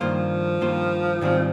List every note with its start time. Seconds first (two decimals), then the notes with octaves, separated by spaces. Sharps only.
0.01 G2 D#3 F3 A#3 F4 C5
0.61 G2 D#3 A#3 F4 C5
1.21 G#2 D#3 G3 C4